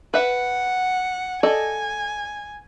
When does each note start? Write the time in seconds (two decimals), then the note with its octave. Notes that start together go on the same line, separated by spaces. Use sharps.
0.14 B4 E5 F#5
1.43 A4 D5 D#5 G#5